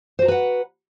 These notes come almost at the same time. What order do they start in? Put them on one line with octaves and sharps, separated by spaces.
C5 F#4 A#5 B4 F#5